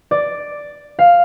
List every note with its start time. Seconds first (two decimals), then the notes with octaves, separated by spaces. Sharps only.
0.11 D5
0.99 F5